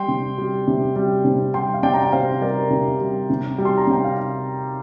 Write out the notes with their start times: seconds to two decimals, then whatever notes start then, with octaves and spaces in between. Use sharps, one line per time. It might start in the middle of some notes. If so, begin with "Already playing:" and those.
Already playing: G3 G5 C6
0.08 C3
0.38 G3
0.67 C3
0.96 G3
1.25 C3
1.54 G3 G5 C6
1.74 F5
1.83 C3 D5 G5
1.94 A#5
2.04 G5
2.12 C3 C5 F5
2.41 G3 A#4 D5
2.70 C3
3.01 G3
3.30 C3
3.58 G3
3.65 C6
3.77 A#5
3.87 C3 G5
4.04 F5